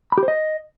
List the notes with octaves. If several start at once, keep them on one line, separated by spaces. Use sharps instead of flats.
B5
G4
C5
D#5